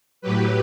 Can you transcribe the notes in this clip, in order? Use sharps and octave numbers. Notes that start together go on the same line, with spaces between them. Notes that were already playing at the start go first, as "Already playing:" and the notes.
A2 F#3 G4 B4